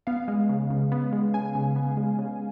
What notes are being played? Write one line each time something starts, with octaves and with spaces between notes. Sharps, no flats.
B3 F5
G#3
C#3
C#3
B3
G#3
C#3 G#5
C#3
B3
G#3
C#3